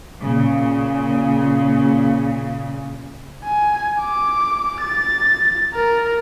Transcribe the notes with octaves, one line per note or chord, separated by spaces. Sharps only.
A#2 C#3
G#5
D6
A6
A#4